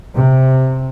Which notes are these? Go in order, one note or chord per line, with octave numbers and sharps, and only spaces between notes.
C3